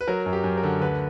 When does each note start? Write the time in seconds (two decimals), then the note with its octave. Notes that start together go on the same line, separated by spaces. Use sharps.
0.01 B4
0.07 F#3 A#4
0.26 F#2
0.33 G4
0.44 F#2
0.57 A#4
0.63 D3
0.81 D2 B4